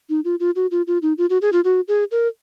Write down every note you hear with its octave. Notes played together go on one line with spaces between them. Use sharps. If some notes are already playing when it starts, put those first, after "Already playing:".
D#4
F4
F4
F#4
F4
F4
D#4
F4
F#4
G#4
F4
F#4
G#4
A#4